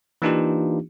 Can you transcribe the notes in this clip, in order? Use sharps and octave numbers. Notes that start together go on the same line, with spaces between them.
E3 A#3 D4 D#4 F4 G4